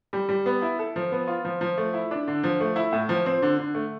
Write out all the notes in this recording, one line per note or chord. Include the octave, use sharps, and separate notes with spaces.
G3
G3
B3
E4
A4
F3
B3
F4
F3
F3
A3
E4
D4
D3
F3
A3
E4
A2
F3
C4
D3
D3
A3